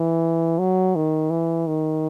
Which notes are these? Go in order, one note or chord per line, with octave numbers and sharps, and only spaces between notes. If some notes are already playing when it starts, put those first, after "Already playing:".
Already playing: E3
F#3
D#3
E3
D#3